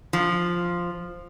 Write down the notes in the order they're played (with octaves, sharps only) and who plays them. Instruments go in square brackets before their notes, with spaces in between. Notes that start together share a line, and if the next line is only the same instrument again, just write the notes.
[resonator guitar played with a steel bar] F3